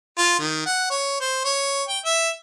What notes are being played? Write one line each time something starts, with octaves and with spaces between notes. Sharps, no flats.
F4
D#3
F#5
C#5
C5
C#5
G5
E5